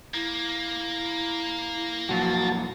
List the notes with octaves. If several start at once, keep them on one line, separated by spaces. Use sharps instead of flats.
A#3 E4
F2 A#2 F#3 F#4 A5